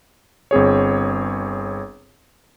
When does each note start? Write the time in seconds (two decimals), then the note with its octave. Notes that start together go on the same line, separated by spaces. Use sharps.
0.51 G1 C4 G#4 C#5